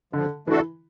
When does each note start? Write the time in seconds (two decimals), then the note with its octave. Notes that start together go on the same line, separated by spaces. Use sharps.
0.13 D3 F3
0.47 E3 A3 D4 F#4 A4